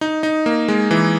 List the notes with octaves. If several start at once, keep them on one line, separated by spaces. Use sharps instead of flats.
D#4
D#4
A#3
G#3
E3